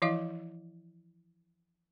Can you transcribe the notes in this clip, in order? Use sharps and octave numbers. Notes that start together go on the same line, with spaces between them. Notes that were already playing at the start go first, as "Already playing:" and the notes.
E3 F3 E4 D#5 F5 D6